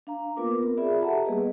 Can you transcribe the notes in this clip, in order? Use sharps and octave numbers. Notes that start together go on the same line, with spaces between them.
D4 F5 A#5
A#3 B3 F4 A#4 B4 D6
C4 A#4
F4 G#4 D5 E5 B5
G4 A4 E5 F#5 A5 A#5
G3 A#3 B3 G#4 B4 D#5